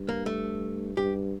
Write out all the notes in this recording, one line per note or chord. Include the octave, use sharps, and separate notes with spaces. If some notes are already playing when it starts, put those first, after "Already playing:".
Already playing: G2
A#3
A3
G2 G4